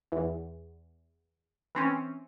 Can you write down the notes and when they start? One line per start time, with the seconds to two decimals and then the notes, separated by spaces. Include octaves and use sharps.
0.12 E2
1.75 E3 C4 C#4